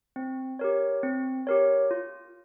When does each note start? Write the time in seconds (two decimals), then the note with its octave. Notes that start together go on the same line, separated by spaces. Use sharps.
0.16 C4
0.59 G4 A#4 C#5
1.03 C4
1.47 G4 A#4 C#5
1.91 F4